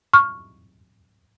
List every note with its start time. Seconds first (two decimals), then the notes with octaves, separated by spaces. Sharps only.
0.14 C#6 F6